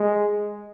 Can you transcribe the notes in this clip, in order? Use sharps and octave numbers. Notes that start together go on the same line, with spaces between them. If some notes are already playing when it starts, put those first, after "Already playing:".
Already playing: G#3